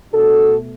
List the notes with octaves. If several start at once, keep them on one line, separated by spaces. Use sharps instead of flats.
B2 A3 D4 F#4 A4